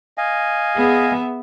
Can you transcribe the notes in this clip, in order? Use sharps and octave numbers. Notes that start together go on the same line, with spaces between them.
D#5 F5 G#5
B3 G#4 E5